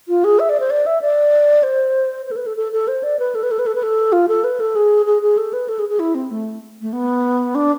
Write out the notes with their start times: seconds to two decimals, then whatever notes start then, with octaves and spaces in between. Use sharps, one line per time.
0.08 F4
0.24 G#4
0.39 E5
0.49 D5
0.60 C5
0.70 D5
0.86 E5
1.02 D5
1.63 C5
2.26 C5
2.31 A4
2.36 B4
2.46 A4
2.57 A4
2.72 A4
2.88 C5
3.03 D5
3.19 B4
3.35 A4
3.43 B4
3.51 A4
3.59 B4
3.66 A4
3.75 B4
3.83 A4
4.12 F4
4.28 A4
4.44 B4
4.60 A4
4.76 G#4
5.06 G#4
5.22 G#4
5.37 A4
5.53 B4
5.69 A4
5.79 G#4
5.89 G#4
5.99 E4
6.15 C4
6.31 A3
6.82 A3
6.93 B3
7.55 D4